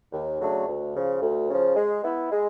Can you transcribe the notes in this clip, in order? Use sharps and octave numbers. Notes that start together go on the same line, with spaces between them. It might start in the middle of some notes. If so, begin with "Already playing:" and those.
D#2
C#3 F#3 A3 D4
D2
C#3 F3
D2
C#3 F3
G#3
B3 E4
G#3